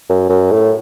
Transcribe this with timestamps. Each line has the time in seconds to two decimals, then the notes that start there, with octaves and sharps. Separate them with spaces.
0.09 F#2
0.29 F#2
0.51 A2